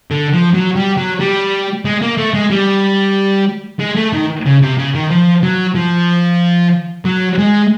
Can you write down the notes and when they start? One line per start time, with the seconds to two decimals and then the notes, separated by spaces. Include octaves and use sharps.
0.11 D3
0.34 F3
0.54 F#3
0.76 G3
0.98 F#3
1.20 G3
1.85 G#3
2.02 A#3
2.18 A3
2.34 G#3
2.50 G3
3.80 G#3
3.96 A3
4.13 D#3
4.45 C#3
4.62 C3
4.78 C#3
4.95 D#3
5.10 F3
5.43 F#3
5.75 F3
7.05 F#3
7.39 G#3